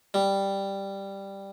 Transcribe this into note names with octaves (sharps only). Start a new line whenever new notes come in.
G3